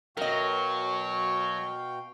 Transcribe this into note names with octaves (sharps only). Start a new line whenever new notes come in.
B2 F#3 A#4 D#5 F5 G5 C#6